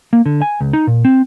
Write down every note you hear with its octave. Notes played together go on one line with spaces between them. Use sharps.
A#3
D3
G#5
C#2
D#4
A#2
C4